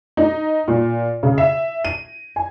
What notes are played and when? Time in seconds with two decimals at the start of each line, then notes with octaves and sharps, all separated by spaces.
0.17 D#4
0.68 A#2
1.23 C#3
1.38 E5
1.85 D#7
2.36 G#5